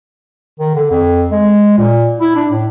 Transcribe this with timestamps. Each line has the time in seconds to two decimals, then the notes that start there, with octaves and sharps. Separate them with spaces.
0.59 D#3
0.75 D3
0.91 F2
1.32 G#3
1.78 A#2
2.20 E4
2.36 D4
2.50 A2